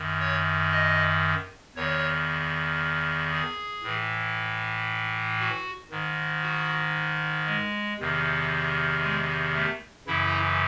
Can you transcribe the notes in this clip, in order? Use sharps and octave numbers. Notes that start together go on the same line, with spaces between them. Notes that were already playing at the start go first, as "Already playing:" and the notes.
Already playing: F#2 D#3
C#5
D#5
E2 D#3 C#5
G#4
A2 E3
F#4
G#2 D#3
F#4
G#3
E2 C3 D#3
G#3
A3
F#2 C#3 E3 E4